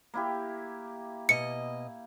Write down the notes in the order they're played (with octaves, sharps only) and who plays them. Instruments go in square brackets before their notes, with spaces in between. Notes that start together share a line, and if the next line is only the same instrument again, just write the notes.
[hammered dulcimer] A#3 E4 G4
[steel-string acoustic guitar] B2 D#5 [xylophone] C#7